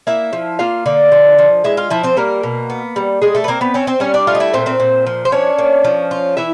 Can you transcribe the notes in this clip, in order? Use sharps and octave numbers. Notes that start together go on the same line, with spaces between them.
A#3 E4 E5
F3
A#3 F4 F5
D3
F3
F3
G#3 E4 E5
F4 F5
F3 E4 E5
C4 C5
G3 A#3 A#4
B2
B3
G3
G3 G#3 G#4
A3 A4
B4
A#3 C4 A#4
B3 B4
C4 C#4 C#5
C4 C5
G3 C#4 C#5
D4 D5
A3 F4 F5
D#5
E4 E5
A#2 C4 C5
C4 C5
A#2
F3
C5
C#4 D4 C#5
A#3
F3
F4
E3 E4 E5